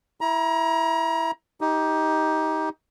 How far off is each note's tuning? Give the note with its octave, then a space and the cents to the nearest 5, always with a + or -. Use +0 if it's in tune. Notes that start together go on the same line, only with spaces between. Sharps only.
E4 +0 A#5 +30
D#4 +20 G4 +0